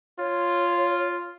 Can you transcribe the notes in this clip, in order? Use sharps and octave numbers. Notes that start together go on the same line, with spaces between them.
F4 C#5